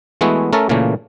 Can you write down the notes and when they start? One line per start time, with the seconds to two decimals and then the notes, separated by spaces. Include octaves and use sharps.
0.21 E3 G#3 A3 B3 E4 F#4
0.53 A3 C#4 A4 A#4 A5
0.69 A#2 C#3 E3 A3 A#3